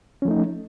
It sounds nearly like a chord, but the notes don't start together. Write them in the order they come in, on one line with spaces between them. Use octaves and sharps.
C#4 F3 A3 D#4